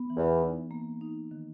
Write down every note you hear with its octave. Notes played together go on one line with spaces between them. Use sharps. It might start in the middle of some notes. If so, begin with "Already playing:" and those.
Already playing: B3
E3
E2
D#4
A#3
D#4
D#3